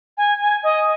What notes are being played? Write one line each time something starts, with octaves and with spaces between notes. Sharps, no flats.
G#5
G#5
D#5